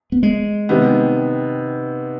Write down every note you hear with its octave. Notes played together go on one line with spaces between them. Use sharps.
B3
G#3
C3 D#3 B3